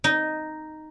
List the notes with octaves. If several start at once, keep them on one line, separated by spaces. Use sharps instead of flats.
D#4